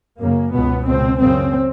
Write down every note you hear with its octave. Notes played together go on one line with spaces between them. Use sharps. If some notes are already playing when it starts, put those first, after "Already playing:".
F#2 C#3 A#3
C#2 B2 B3
C#2 B2 C4
F#2 C#3 C4